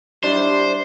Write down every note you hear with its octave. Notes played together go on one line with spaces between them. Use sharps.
G3 D4 E4 C5